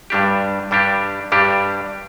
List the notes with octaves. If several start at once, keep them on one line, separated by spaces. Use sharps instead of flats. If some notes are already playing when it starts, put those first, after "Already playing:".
G2 G3 D4 G4
G2 G3 D4 G4
G2 G3 D4 G4